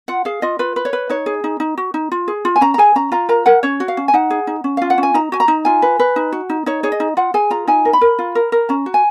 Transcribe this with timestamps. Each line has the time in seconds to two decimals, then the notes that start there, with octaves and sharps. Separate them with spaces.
0.08 F4 F#5
0.25 G#4 F5
0.42 F4 D#5
0.59 F4 B4
0.76 B4
0.85 C#5
0.93 B4
1.10 D#4 C#5
1.26 G#4
1.44 D#4
1.60 D#4
1.77 F#4
1.94 D#4
2.12 F4
2.28 G#4
2.45 F4
2.56 G#5
2.61 C#4 A#5
2.74 A#5
2.78 G#4 G#5
2.96 C#4 A#5
3.12 F4 A#5
3.29 A#4 A#5
3.46 A#4 F#5
3.63 C#4 C#5
3.80 F#4
3.88 F5
3.97 C#4
4.08 G#5
4.14 D#4 F#5
4.30 G#4
4.47 D#4
4.64 C#4
4.77 F4 F5
4.90 F#5
4.98 C#4
5.03 G#5
5.14 D#4 A#5
5.32 F#4 G#5
5.40 A#5
5.48 D#4
5.65 F4 G#5
5.82 B4
5.99 B4
6.16 D#4
6.32 F#4
6.50 D#4
6.66 D#4 C#5
6.83 G#4 C#5
6.92 D#5
7.00 D#4
7.17 F4 F#5
7.34 G#4 G#5
7.50 F4 A#5
7.67 D#4 G#5
7.85 A#4
7.93 B5
8.01 A#4
8.19 F4
8.35 A#4
8.52 A#4
8.69 C#4 A#5
8.86 F#4
8.94 G#5